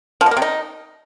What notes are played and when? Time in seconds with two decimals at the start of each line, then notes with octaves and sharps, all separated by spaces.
0.21 F3
0.26 B2
0.31 A#3
0.37 C3
0.42 D#4